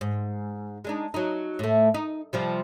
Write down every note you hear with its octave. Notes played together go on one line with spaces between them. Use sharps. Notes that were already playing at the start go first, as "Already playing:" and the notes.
G#2
G#3 D4 D#4
F#3 D#4
A2 A3
D#4
C3 F3 G3